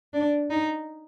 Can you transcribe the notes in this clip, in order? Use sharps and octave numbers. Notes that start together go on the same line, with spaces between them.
D4
D#4